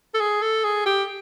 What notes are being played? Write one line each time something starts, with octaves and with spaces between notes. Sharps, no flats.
A4
G#4
A4
G#4
G4